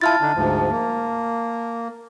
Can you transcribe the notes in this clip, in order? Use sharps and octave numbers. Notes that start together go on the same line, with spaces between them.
E4 F4 A5 F6 A6
D3 D4 D#4
D2 G#2 F3
A#3